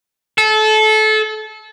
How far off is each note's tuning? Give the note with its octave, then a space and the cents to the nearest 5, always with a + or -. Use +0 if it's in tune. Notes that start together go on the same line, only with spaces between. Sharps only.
A4 -25